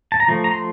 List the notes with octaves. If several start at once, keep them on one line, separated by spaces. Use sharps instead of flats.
A5
A#5
F3 A3
A#5
C6